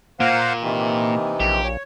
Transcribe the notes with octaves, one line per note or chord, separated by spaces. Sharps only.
A#2 A#3 C5 F5 F#5
C3 D#3 E3
A#1 G4
C#5